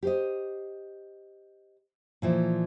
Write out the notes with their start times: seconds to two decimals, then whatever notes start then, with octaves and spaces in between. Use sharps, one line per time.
0.03 G4 C5 D#5
2.22 A#2 E3 F3